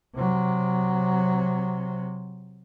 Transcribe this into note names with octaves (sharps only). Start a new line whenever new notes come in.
C3 F#3